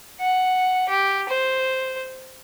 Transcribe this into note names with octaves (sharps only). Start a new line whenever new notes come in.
F#5
G4
C5